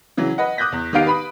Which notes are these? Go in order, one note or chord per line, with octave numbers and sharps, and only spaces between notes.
C#3 E3 F#3
B4 D#5 F#5
D6 D#6 F#6 G6 A#6 B6
E2
D#3 B3 D#4 G4 F5 D7
B4 B5 D#6